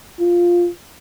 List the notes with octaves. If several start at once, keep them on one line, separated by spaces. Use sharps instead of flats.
F4